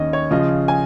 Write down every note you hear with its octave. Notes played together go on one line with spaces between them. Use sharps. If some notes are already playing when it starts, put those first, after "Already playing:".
Already playing: D#2 D#3 C#4 D#5
C#5
C#3 F3 C#4 F4 D#5
G#5